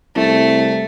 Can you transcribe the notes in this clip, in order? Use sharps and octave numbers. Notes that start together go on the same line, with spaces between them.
C2 A3